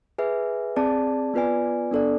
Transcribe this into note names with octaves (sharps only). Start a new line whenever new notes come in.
G#4 B4 E5 G#5
C4 G#4 D5 A5
B3 F4 B4 D5 G#5
B3 D4 A4 D5